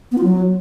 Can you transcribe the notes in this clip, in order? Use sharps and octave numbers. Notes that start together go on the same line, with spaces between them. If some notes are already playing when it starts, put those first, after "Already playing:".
B3
F4
F#3